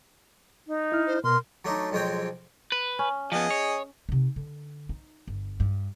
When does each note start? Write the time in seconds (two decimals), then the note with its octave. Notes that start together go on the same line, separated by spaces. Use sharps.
0.67 D#4
0.92 E4 F6
1.07 C5
1.24 B2 A#4 C6
1.65 F#3 A3 D4 D#4
1.92 B1 F2 G#3 C4 C#5 G5
2.72 B4
2.99 C#4
3.32 F3 B3 G#4 D#5
3.51 C#5
4.09 C3 D#4
4.36 D3
4.89 D#4
5.28 G1
5.60 G2